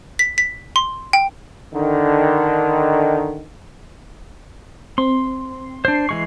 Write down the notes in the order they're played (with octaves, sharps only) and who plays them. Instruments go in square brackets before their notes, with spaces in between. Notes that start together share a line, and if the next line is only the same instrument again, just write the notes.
[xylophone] B6
B6
C6
G5
[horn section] D3 D#3
[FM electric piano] C4 [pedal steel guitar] C6
[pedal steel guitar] D4 C5 [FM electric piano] C7
[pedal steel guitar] E3 G#3 C#6